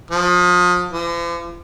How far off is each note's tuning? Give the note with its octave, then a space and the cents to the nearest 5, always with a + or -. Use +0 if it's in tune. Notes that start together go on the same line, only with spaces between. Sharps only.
F3 +35
F3 -45